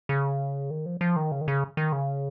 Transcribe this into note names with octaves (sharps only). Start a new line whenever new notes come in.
C#3
D#3
F3
F3
D#3
C#3
D#3
C#3
D#3
C#3